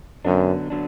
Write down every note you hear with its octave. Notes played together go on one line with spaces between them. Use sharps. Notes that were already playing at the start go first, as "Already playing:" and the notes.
F#2 D3 F#3 B3 D4
D3 F#3 B3 D4